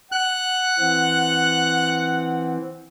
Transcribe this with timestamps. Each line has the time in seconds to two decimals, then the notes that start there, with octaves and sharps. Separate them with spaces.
0.12 F#5 F#6
0.79 E3 C4